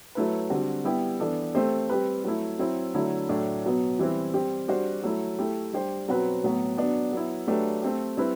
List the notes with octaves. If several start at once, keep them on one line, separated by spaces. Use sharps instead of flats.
F#3 A3 E4 B4
D3 G3 C4 F#4
G3 B3 E4 G4
E3 B3 D4 A4
A3 C4 G4 C5
G3 C4 G4 B4
F#3 A3 E4
F#3 C4 E4
D3 F#3 A3 E4
A2 F#3 A3 D4
B2 F#3 B3
E3 G3 C4 E4 B4
G3 C4 G4
G3 D4 F#4 C5
F#3 A3 E4
A3 E4 G4
G3 D4 G4 C5
B2 F#3 C4 F#4 B4
A2 F#3 B3 F#4
F#3 B3 D4
F#3 B3 E4
F#3 A3 D4 G4 B4
A3 C4 G4
G3 C4 E4 B4